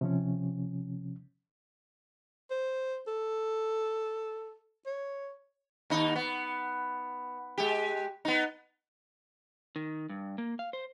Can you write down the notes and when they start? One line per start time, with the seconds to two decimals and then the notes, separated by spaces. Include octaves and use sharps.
0.01 C3 F3 C#4
2.51 C5
3.08 A4
4.86 C#5
5.90 D#2 D#4
6.16 B3
7.58 G#3 G4
8.25 B3 D#4
9.76 D#3
10.09 G2
10.38 A#3
10.59 F5
10.73 C5